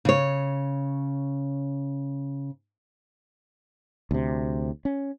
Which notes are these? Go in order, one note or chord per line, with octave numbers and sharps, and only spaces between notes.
C#3 C#5
D2 C3
C#4